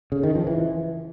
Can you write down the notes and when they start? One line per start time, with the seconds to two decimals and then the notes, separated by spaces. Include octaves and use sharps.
0.12 C#3
0.23 D#3
0.35 F3
0.47 E3